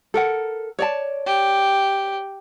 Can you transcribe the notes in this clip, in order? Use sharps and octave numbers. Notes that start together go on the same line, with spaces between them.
A4 A#4 F#5
C#5 D5 A5
G4